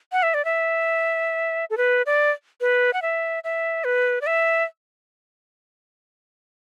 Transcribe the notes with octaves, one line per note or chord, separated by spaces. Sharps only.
F#5
E5
D5
E5
A4
B4
D5
B4
F#5
E5
E5
B4
D5
E5